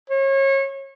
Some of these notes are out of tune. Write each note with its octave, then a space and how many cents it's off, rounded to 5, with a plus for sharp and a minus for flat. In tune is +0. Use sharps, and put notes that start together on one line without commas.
C#5 -30